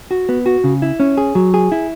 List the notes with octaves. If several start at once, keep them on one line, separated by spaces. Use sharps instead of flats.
F#4
B3
F#4
C#3
E4
C#4
G#4
F#3
G#4
E4